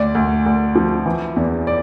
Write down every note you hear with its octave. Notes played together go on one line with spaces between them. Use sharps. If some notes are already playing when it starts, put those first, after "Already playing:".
Already playing: D2 D5
D2
D2
F3
E3
E2
D5